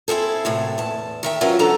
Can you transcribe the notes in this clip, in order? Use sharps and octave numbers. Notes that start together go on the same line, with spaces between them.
C4 E4 G#4 A4
F#2 A2 C3
E2 A5
D#3 E5 G5
E3 F#3 C#4 F4 A#4 C5
D3 F#3 B3 D4 A4 A#5